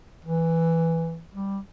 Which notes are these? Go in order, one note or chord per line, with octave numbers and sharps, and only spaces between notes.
E3
G3